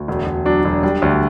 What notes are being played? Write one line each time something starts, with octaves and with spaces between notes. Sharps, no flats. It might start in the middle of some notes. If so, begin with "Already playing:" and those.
Already playing: D2
E1
E1
F#3 D4
E1
G3 D4
D2